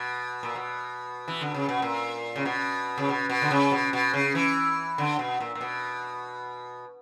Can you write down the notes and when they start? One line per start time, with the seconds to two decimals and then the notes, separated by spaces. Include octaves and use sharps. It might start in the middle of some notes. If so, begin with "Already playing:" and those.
Already playing: B2
0.43 A#2
0.56 B2
1.28 E3
1.41 D3
1.54 C#3
1.69 B2
1.82 A#2
2.36 C#3
2.45 B2
2.98 C#3
3.09 B2
3.29 B2
3.42 D3
3.51 C#3
3.71 B2
3.93 B2
4.14 C#3
4.35 E3
4.98 D3
5.19 B2
5.40 A#2
5.55 A#2
5.61 B2